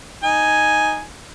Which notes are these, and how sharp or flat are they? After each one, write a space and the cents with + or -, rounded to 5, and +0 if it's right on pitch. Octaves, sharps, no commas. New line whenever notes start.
D#4 +0 G#5 +0